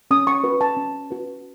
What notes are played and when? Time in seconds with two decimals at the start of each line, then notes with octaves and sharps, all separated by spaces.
0.11 C#4 D#6
0.27 C#6
0.44 F#4 B4
0.61 A5
0.77 C#4
1.11 F#4 B4